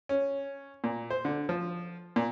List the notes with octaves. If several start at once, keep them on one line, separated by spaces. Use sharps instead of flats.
C#4
A#2
C5
D3
F3
A#2